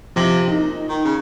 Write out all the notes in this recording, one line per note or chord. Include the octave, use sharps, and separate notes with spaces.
C3 F3 A#6 F#7
A#2 D#4
D#3
C#3